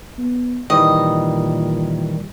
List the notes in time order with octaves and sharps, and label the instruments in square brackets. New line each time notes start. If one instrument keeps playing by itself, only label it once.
[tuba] B3
[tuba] A#2 [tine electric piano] D#3 E3 G3 [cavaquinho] D#5